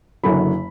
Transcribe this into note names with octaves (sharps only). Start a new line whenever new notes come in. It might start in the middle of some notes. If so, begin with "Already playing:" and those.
F#1 F#2 D3 F#3 B5